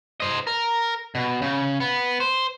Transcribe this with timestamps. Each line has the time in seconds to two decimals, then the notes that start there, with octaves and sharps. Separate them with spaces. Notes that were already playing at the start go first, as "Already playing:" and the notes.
0.20 C5 D#5
0.47 A#4
1.15 B2
1.42 C#3
1.80 B3
2.20 C5